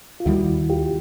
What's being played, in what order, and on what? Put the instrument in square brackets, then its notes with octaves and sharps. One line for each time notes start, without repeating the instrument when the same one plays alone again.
[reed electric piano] F4
[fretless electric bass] D#2 D#3 G3 [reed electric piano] E4 F#4
[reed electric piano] F4 G4